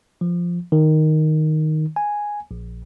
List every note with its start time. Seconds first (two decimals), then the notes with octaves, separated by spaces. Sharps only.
0.21 F3
0.72 D#3
1.96 G#5
2.51 A#1